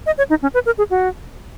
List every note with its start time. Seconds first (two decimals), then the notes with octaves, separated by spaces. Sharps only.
0.06 D#5
0.18 C#5
0.30 D#4
0.42 C#4
0.54 B4
0.66 A#4
0.78 G#4
0.90 F#4